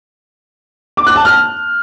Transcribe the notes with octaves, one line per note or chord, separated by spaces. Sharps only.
D6
F#6
A5
F6